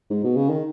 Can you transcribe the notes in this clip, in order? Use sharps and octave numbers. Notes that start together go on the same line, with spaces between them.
G#2
B2
C#3
D#3